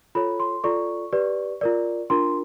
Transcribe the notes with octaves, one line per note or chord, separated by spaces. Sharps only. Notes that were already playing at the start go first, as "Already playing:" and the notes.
F4 A4 C#5 B5
C6
F4 A4 D5 C#6
G4 B4 D5
F4 A#4 D5
D4 F4 A#4 C6